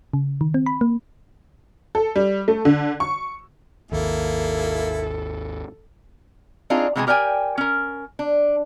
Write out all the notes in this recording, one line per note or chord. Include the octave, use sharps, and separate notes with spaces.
C#3
D#3
C4
B5
A#3
A4
G3
A3
D3
C#6
G#1 D#2 A#3 E4 A4
C4 D4 D#4 F4 G#4
C3 E3 G#3 B3 C4 G#4
G4 A#4 D5 G5 G#5
C#4 A#4
D4